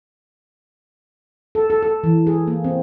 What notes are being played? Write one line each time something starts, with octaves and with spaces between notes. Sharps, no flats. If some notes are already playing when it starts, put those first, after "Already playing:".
A4
A4
A4
E3
G#4
A#3
C4